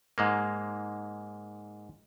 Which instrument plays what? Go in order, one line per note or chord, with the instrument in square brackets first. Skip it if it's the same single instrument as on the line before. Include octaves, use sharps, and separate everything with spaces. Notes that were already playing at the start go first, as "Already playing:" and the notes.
[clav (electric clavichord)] G#2 G#3 A#3